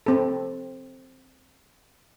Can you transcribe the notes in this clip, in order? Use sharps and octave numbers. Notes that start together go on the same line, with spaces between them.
C4 A4